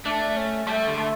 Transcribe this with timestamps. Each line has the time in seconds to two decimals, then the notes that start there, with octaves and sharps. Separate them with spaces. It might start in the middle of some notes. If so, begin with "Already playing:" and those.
0.05 A3 D4
0.37 C#4
0.67 G3 A3
0.87 D3
0.98 A3